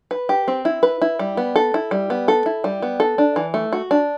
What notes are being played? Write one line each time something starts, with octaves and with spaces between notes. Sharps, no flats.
B4
G4
C4
E4
B4
E4
G3
B3
A4
E4
G3
B3
A4
E4
G3
B3
A4
D4
E3
A3
F#4
D4